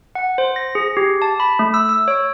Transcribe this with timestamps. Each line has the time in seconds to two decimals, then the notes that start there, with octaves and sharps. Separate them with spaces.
0.15 F#5
0.38 C5
0.56 A#6
0.75 G#4
0.97 G4
1.22 A5
1.40 B5
1.59 A3
1.74 E6
1.89 E6
2.08 C#5